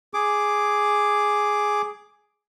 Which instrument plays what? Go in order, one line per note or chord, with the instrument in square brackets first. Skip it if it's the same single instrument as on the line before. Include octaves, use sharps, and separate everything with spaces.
[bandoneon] G#4 D6